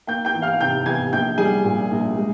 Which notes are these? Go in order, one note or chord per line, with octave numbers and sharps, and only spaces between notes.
A#3 G5 G6
G5 G6
E3
F5 F6
C3 G5 G6
E2 G#5 G#6
A#1 G5 G6
G3 G#4 G#5
A#2
A#1
G#3